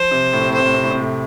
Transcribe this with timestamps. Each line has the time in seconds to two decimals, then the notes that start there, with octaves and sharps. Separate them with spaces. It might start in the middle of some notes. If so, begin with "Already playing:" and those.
Already playing: F3 C5
0.11 C3
0.33 A2
0.41 C3
0.49 A2
0.55 C3 C5
0.66 A2
0.74 C3
0.83 A2
0.91 C3
1.00 A2